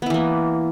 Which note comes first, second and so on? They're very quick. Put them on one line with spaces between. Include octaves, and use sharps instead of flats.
B3 E4 E3 A#3